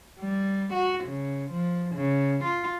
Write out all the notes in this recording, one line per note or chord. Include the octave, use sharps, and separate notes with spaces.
G3
F#4
C#3
F3
C#3
F4